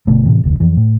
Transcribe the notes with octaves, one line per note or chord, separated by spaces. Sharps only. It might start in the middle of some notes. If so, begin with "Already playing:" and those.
G1 B2 D3 A3
A2 C3 E3
F1 D2
F2 E3
A2